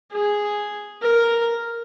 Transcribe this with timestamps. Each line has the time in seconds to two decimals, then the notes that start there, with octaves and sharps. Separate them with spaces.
0.12 G#4
1.02 A#4